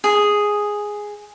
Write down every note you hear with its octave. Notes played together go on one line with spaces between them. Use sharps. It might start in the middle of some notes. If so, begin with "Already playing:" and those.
G#4